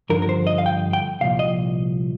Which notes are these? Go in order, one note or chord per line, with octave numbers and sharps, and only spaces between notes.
G2 D3 F3 A#4
A#4
C5
D#5
F5
G5
G5
C2 A#2 F3 F5
D#5